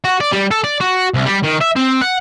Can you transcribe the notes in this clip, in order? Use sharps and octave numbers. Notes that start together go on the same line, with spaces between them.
F#4
D5
G3
A4
D5
F#4
C2
G3
D#3
E5
C4
F#5